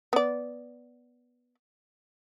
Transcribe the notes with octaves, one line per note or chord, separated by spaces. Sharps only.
B3 D5